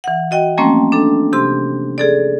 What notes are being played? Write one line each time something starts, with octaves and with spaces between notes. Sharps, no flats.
E3 F#5
F#4 D#5 G5
F3 G3 A3 A#3 C4 C#4
D4 A4
C3 G4 C6
G#4 A4 D5